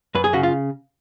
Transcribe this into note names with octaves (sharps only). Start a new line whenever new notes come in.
F#2 B4
G#4
C#3 F#4
F4